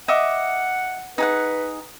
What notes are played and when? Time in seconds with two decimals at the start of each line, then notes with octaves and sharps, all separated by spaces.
0.08 D#5 E5 F#5 D6
1.18 D#4 G#4 B4 F#5